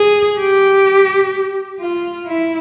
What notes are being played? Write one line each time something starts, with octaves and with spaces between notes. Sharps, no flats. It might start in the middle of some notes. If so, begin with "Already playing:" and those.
Already playing: G#4
G4
F4
E4